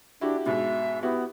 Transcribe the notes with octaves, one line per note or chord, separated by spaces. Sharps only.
D4 E4 F#4 G4
G#2 B2 E5
B3 E4 F#4 G4